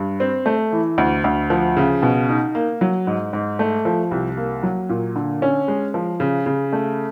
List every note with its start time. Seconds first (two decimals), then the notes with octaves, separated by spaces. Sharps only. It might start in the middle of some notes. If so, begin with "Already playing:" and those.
Already playing: G2
0.20 C4
0.46 A3
0.72 E3
0.98 D2
1.24 D2
1.50 F3
1.77 C#3
2.03 B2
2.29 D#4
2.55 A#3
2.81 F#3
3.07 G#2
3.33 G#2
3.59 A3
3.85 F3
4.11 C2
4.37 A#3
4.63 F#3
4.89 A#2
5.16 D3
5.42 C#4
5.68 G#3
5.94 F3
6.20 C#3
6.46 C#3
6.73 A3